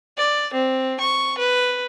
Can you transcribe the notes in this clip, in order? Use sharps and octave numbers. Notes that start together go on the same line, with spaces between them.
D5
C4
C#6
B4